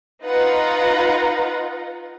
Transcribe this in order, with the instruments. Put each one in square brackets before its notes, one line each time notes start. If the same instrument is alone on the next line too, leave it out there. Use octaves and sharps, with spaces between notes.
[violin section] D#4 F4 B4 F#5 A#5